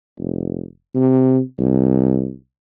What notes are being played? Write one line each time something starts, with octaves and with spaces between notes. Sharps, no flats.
F1
C3
C2